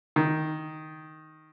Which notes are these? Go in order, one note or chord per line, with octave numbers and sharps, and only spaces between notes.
D#3